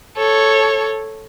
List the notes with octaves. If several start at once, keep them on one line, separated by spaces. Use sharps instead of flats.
A4 C#5